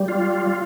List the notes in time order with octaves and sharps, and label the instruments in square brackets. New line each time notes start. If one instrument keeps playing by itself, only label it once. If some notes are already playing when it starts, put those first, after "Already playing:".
Already playing: [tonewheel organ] G3
F4